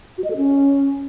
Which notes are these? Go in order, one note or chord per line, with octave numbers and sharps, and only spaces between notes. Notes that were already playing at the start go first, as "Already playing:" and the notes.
F#4
D#5
A4
C#4